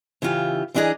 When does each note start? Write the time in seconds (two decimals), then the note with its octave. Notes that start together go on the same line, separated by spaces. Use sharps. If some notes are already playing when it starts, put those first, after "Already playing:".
0.22 C#3 E3 E4 F4 G4
0.74 E3 B3 D4 D#4 G#4 D#5